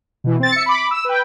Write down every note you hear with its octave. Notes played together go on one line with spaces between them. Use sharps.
B2 E3
C4 A6
E5 C#7
B5 D6
E6
B4 G5